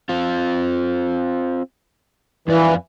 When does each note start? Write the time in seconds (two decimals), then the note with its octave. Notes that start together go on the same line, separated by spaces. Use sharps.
0.09 C4 F4
2.48 F2 E3 D5 F5